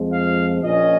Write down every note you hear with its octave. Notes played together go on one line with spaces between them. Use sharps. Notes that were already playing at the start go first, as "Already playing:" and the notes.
Already playing: F2 F3 G#3
F5
A#1 A#2 F3 C#4 D#5